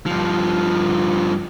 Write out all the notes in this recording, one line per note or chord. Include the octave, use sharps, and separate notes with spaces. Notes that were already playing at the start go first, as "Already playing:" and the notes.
G2 F3